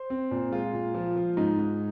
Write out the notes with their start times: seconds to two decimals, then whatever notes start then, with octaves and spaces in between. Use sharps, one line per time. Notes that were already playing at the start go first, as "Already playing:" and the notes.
Already playing: C5
0.10 C4
0.31 A#2
0.52 G#3 F4
0.73 A#2
0.94 F3
1.16 F3
1.37 G#2 D#4
1.58 G#2